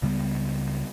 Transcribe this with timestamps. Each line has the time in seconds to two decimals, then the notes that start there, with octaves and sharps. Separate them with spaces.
0.02 C#2 C#3 G3 B3